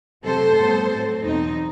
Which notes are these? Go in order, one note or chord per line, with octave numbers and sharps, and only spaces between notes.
C3 F#3 A3 A4 C5
A2 G3 B3
A2 F#3 C4
E2 B2 F#3 C4 D#4